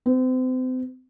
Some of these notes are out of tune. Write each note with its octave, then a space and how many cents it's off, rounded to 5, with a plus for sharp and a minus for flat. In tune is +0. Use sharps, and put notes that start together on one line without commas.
C4 -35